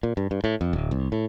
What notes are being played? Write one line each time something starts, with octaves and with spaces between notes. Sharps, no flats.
A#2
G2
G2
A2
F2
D1
C2
A2